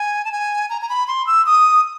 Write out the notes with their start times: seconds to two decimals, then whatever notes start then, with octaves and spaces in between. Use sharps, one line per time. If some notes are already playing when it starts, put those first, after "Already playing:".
Already playing: G#5
0.25 A5
0.32 G#5
0.70 A#5
0.81 A#5
0.89 B5
1.08 C6
1.27 E6
1.46 D#6